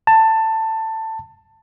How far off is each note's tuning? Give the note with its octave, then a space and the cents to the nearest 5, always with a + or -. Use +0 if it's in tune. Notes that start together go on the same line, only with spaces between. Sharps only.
A5 +15